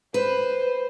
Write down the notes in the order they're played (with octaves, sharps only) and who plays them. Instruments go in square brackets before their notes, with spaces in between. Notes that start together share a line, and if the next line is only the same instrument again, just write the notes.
[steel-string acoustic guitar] B4 [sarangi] C5